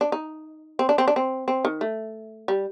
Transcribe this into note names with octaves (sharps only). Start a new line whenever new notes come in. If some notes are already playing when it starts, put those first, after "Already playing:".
D4
D#4
C4
D4
C4
D4
C4
C4
D#3
A3
G3